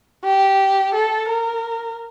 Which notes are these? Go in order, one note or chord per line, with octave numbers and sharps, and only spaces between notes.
G4
A4
A#4